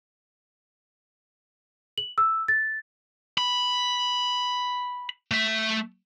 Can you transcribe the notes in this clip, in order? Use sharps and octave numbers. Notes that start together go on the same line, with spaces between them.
F#7
E6
A6
B5
A3 E5